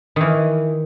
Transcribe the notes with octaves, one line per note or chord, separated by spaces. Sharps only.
D#3 E3